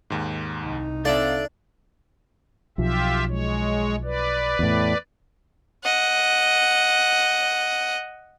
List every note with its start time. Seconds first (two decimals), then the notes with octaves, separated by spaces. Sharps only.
0.10 D#2 G#2
0.62 C2 D#4
1.05 C4 D4 A4 D5 E5 F5
2.78 B1 F3 F4 G4 E5
3.29 G#3 C#5
4.04 B4 D5
4.59 E2 A2
5.84 D#5 F#5